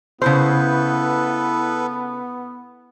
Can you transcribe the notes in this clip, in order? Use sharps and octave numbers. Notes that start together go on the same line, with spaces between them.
C#3 B3 E4 A4 B4 C5